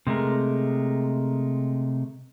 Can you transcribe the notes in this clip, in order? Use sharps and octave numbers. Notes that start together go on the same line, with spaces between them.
C3 G#3 A3 A#4